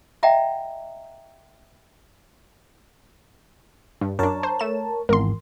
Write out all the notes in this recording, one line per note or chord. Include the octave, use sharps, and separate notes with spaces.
D#5 E5 F#5 G5 A#5
G2
F#2 D4 A#4 C#5 A5
C5
A3 E7
G#1 E2 A#4 C6